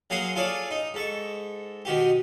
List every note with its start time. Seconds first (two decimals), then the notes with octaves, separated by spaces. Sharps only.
0.10 F#3 A#3 G#4 F#5 C6
0.36 F4 G#4 A4 C#5 D5
0.71 D#4
0.94 G#2 A4 C#6
1.85 B2 D#3 F#4 G4